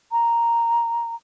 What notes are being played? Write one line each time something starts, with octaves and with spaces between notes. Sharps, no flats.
A#5